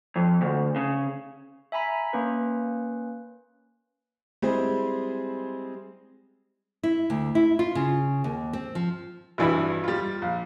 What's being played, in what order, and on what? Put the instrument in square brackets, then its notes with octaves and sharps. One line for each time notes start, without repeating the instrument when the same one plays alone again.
[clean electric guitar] F2
D2
C#3
[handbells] E5 G#5 A#5 B5 B6
A#3 C#4 B4
[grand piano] G3 G#3 C4 E4 G#4 C5
[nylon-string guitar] E4
D2
E4
F4
C#3
D#2
C4
F3
[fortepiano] G#1 G2 E3 E4 G4 B5
G3 F4
A#1